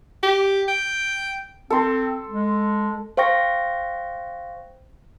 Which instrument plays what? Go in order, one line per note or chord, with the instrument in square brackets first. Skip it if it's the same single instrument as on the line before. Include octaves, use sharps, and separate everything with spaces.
[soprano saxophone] G4
G5
[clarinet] C4 [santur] A4 C6
[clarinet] G#3
[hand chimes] C5 F5 G5 C#6 A#6